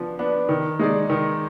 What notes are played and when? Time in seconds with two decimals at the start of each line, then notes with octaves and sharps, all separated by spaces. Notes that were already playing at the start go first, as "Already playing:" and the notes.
Already playing: F3 B3 D4
0.19 B3 D4
0.49 D#3
0.79 G#3 D#4 G#4 D5
1.10 D#3